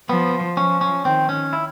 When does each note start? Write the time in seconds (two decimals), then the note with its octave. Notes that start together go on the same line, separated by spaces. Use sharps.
0.09 F3 B3
0.57 F3 C#4
0.81 C#4
1.05 D#3 C4
1.29 C#4
1.53 E4